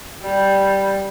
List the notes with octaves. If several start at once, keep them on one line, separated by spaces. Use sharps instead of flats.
G3